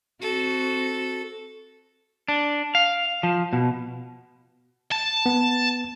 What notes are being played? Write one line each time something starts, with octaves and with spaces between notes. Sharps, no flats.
C4 F#4 A4
D4
F5
F3
B2
A5
B3